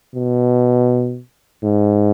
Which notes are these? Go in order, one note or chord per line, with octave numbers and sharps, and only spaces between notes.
B2
G#2